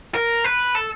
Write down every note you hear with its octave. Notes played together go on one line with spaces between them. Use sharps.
A#4
B4
A4